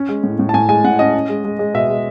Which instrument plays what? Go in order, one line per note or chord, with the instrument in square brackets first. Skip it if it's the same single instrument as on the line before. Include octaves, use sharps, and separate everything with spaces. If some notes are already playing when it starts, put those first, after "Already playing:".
Already playing: [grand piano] C#4
G#3
A2
A2
A5
A2 G#5
G#3 G#5
A2 F#5
C#4 D#5
C#4
G#3
G#3
G#3
B2 E5
G#3